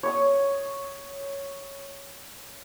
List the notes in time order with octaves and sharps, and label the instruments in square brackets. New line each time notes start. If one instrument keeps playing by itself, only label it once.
[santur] C#5 C#6 D#6